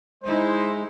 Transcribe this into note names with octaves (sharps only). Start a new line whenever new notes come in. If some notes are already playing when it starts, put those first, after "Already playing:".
G#3 D#4 E4 C5